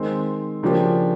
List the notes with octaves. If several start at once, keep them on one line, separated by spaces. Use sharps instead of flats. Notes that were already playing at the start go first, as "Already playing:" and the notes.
Already playing: D#3 G#3 C4
C#3 F3 A#3 D4 G4